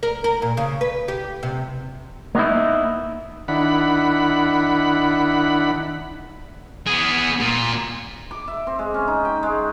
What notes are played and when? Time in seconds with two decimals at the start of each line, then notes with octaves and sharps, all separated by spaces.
0.03 A#4
0.24 A#4
0.42 A#2
0.57 C#3
0.81 B4
1.08 G4
1.43 C3
2.35 A#3 B3 D#4 E4
3.48 D#3 D4 E4 F#5 B5
6.86 B3 G#4
7.39 A#2
8.31 D6
8.48 E5
8.67 C4
8.79 G#3
8.94 C#4
9.08 D#4
9.25 G5
9.43 G#3